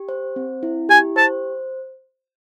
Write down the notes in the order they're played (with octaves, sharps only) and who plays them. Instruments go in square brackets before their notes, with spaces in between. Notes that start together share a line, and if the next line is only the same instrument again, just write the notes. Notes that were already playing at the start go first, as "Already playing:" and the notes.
Already playing: [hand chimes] G4
C5
C4
E4
[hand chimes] G4 [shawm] G#5
[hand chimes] C5 [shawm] A5